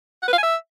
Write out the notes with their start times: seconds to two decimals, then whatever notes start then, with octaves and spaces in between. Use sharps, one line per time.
0.23 F#5
0.28 B4
0.33 F5
0.38 G#5
0.43 E5